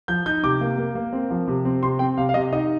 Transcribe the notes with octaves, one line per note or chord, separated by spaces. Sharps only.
F3 G6
D#4 G6
C3 D6
A#3
A#3
A#3
C4
F3
C3
C4
C3 C6
C4 G5
C3 F5
F5
C3 D#5
D#4 D#5